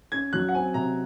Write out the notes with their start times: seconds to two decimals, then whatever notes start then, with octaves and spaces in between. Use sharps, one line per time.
0.12 C#4 G#6
0.33 F#3 F#6
0.49 F#5
0.54 C4 G#5
0.74 C3 A#5